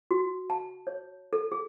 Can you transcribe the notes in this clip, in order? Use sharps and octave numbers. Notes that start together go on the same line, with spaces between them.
F#4
A5
C#5
A4
G#4